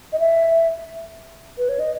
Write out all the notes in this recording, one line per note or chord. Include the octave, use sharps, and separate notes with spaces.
D#5
E5
B4
C#5
D#5